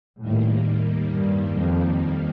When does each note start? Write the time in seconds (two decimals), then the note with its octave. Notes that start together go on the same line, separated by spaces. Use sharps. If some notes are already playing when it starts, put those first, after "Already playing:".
0.21 D#2 A2 D#3 G3 A#3
1.14 G2
1.61 F2